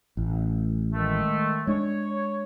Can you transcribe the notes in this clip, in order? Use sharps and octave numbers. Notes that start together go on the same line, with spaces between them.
A1
D#3 G#3 A3
G#3 D4 C#5